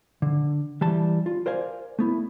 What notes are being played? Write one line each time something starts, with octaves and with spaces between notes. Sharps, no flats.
D3
E3 G3 A5
F4
A#4 C5 D5 F5 G#5
A3 B3 E4